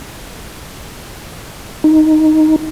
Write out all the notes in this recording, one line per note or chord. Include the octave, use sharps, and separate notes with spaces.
D#4